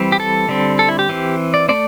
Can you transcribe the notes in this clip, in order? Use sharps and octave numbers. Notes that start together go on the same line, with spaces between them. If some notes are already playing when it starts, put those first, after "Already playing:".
Already playing: E3 G3 C4
G4
A4
D3 G3 C4
A4
E4
G4
E3 C4
D5
A3 C4 D5